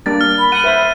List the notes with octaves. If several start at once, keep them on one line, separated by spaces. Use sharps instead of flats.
G3 A#3 D4 A6
F6
B5
F#5 D#7
B4 C5 E5